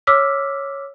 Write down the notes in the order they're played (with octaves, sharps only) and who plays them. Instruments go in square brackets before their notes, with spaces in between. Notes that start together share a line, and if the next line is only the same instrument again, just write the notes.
[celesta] C#5 D6 E6 F6 B6